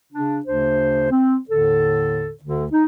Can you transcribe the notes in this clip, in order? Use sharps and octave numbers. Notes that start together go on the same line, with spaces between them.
C#3 D4
D2 C#3 D4 C5
C4
D#2 A2 D3 A4
D2 D3
D#4